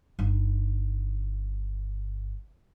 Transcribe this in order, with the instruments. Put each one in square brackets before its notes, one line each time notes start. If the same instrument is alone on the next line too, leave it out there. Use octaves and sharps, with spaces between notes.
[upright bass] G1 D#4